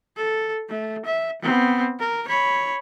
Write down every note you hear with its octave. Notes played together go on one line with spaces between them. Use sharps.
A4
A3
E5
B3 C4
A#4
C#5 B5